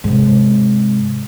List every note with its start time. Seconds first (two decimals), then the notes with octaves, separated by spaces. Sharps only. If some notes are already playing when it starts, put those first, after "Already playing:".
0.04 G#2 C3